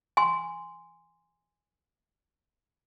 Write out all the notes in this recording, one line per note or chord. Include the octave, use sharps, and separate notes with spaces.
G#5 C6